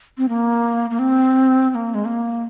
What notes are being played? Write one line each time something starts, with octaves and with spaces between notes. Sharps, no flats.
C4
A#3
A#3
C4
C4
A#3
G#3
A#3